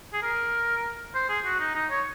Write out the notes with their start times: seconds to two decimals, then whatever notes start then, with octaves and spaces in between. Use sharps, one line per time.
0.13 G#4
0.22 A#4
1.15 C5
1.29 G#4
1.45 F#4
1.60 D#4
1.75 D#4
1.90 C#5